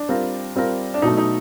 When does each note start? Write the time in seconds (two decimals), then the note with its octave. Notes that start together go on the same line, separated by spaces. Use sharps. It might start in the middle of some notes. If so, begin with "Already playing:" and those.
Already playing: D4
0.09 G3 C4 F4 A#4
0.56 G3 C4 F4 A#4
0.94 D4
1.02 B2 F#3 A3 D#4
1.18 D#4